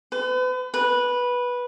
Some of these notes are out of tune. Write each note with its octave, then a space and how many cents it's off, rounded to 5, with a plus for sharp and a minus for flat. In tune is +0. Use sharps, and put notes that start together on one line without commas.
B4 +40
B4 -10